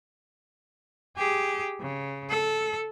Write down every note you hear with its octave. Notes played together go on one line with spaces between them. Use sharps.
G4 G#4
C#3
A4